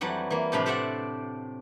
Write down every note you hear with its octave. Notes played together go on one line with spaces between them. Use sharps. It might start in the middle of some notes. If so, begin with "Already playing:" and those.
F2 E3 F#3 G3 F#5
E3 A#3
A2 C3 F3 D4 F5 B5
G4 A4 C5 D5 E5 F#5